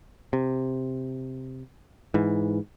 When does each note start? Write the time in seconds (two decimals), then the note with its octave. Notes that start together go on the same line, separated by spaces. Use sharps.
0.33 C3
2.14 G#2 E3